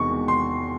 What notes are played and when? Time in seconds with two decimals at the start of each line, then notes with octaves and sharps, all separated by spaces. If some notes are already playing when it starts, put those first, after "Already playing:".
Already playing: E1 E2 C3 D#3 G#3 C#6
0.28 C6